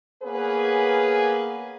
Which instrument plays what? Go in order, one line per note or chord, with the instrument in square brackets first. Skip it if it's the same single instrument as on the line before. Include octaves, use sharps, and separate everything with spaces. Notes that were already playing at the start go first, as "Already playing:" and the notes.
[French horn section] A#3 B3 C#4 G#4 B4